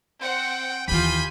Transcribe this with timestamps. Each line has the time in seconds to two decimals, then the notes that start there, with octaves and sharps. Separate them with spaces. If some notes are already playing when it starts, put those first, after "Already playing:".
0.22 C4 F#5 G5
0.88 D#2 E3 F4 G4 G#5 B5 G6